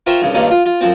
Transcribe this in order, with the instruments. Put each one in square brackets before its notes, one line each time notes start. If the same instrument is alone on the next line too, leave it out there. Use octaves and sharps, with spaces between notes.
[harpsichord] F4 A#4 C5 E5 G5 C#6
C2 G2 C#3
G2 A#2 D#3 A#3 C#4
F4
F4
F#2 F3 C4